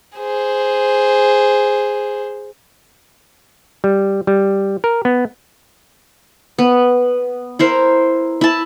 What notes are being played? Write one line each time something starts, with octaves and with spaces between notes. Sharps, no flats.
G#4 C5
G3
G3
A#4
B3
B3
E4 A#4 C5
E4 A5